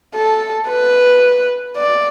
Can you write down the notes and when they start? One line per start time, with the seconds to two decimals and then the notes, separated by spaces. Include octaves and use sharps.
0.15 A4
0.68 B4
1.77 D5